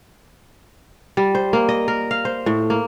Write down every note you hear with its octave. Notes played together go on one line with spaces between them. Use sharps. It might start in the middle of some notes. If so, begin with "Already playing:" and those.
G3
C5
A#3
D#5
A#4
F5
C5
A2
A#3